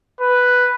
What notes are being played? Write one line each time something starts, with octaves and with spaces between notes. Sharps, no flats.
B4